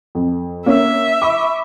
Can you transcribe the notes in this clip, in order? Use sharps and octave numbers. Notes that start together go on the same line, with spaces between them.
F2
A#3 C#4 C#5 E5
B5 C#6 D6